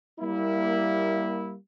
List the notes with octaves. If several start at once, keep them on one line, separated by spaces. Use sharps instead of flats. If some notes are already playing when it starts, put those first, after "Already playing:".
G3 A#3 E4